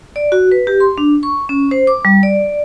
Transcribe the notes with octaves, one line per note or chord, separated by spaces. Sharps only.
D5
F#4
B4
G4
C6
D4
C#6
C#4
C5
D6
G3
D5